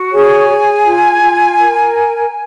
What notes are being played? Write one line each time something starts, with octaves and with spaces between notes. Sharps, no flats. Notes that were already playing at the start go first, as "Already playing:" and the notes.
Already playing: F#4
G#4 C#5 G#5
G#4
F4
F4
A#4